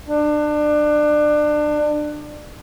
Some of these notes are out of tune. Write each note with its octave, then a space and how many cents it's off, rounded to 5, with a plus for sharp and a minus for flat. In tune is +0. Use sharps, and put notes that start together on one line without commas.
D4 +25